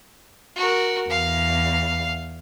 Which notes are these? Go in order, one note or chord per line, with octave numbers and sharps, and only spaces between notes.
F#4 A#4
E2 F5